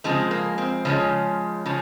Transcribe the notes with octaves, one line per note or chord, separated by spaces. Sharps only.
C#3 F3 G#3 C4
A#3
C4
C#3 F3 G#3 C#4
C#3 F3